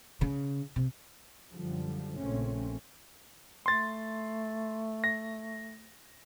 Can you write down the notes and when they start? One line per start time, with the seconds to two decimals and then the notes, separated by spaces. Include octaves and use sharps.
0.21 C#3
0.76 C3
1.51 F#2 D3 F3 G3
2.18 A#1 C#3 A3 C4 C#4
3.66 A3 C6 A6
5.04 A#6